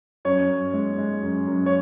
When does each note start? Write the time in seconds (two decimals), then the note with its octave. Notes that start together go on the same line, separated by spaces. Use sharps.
0.25 F#2 C#5
0.49 F#2
0.73 G#3
0.98 G#3
1.22 F#2
1.47 F#2
1.66 C#5